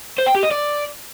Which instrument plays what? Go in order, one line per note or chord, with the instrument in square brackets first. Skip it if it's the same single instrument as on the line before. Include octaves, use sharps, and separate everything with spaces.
[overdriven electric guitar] C5
G5
G4
D#5
D5